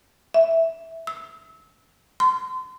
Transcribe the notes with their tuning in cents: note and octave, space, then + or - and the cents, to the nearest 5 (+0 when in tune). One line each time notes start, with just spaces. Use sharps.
E5 +0
E6 -25
C6 -35